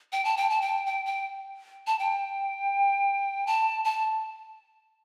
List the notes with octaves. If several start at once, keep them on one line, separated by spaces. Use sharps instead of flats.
G5
A5
G5
A5
G5
G5
G5
A5
G5
A5
A5